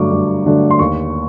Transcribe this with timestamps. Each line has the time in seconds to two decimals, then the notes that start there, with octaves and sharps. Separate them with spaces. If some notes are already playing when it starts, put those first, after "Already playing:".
Already playing: G2 D3 F#3 A3 D4 C#6 D6
0.12 G2
0.46 D3 F#3 A3 D4
0.71 C6
0.79 D#2 C#6